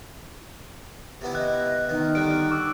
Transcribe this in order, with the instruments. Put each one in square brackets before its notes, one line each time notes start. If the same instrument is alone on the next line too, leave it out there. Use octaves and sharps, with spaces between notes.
[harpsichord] C3 B3 E4
[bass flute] D#5 [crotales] F#6
[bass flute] D#3 [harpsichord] B3
[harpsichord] D3 G3 [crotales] F#6 D7
[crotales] C#6 D6 E6